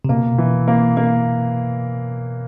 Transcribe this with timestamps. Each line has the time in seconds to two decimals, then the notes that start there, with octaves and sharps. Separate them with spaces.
0.05 C3
0.09 B2 A#3
0.38 E3
0.68 A#3
0.97 A#3